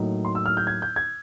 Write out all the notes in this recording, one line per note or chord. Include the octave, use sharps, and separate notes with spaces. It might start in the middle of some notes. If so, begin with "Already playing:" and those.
Already playing: A2 F#3 A#3 D#4
C6
E6
F6
G6
G#6
G6
G#6